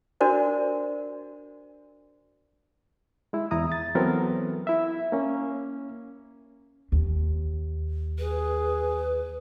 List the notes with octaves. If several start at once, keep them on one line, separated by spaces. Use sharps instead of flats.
D4 F#4 A#4 C5 D5
G#3 E4
E2 E4 A#5 D#6
A6
E3 F#3 B3 C4 A4 A#4
E4 E5
A#3 C#4
D#2
G#4 B4